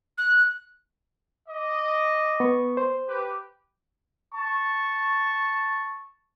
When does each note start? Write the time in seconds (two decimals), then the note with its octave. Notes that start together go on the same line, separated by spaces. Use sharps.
0.18 F#6
1.49 D#5 D6
2.40 B3 C#6
2.77 C5
3.08 G4 B4
4.34 A5 C#6